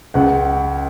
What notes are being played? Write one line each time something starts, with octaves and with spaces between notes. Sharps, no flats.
C#2 F#5